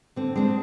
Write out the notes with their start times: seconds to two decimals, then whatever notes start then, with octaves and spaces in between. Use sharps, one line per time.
0.16 D3 C4
0.35 G#3 C4 D4